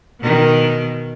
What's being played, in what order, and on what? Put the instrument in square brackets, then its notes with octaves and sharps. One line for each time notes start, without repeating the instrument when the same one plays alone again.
[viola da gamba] B2 D#3